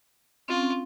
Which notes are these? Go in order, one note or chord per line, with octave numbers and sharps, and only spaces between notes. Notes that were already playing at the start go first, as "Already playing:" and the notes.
C4 C#4 F4